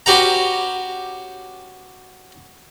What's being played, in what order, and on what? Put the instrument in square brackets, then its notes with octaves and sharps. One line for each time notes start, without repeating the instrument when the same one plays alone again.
[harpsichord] C#4 F#4 G4 B4 F#5 A#5